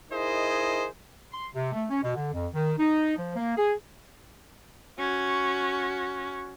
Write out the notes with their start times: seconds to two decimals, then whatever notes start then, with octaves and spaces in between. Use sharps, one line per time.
0.11 D#4 E4 G#4 A#4 C5 D#5
1.33 C6
1.54 C3
1.72 A3
1.90 C#4
2.02 B2
2.15 D3
2.33 F2
2.54 D#3
2.78 D#4
3.16 F3
3.36 A#3
3.56 G#4
4.99 C#4 F#4